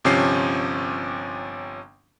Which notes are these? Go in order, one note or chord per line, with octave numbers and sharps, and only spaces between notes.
G1 C3 F3 C#4 C7